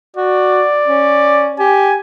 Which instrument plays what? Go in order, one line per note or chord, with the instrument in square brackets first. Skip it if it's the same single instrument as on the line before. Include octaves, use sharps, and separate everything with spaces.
[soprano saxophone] F#4 [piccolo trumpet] D5
[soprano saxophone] C#4
[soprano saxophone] G4 [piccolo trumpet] G#5